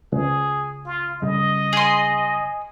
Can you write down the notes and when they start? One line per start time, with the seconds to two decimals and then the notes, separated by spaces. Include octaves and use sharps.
0.12 C#2 G#4
0.86 F4
1.22 F#2 C#3 G3 D#5
1.73 G#4 C6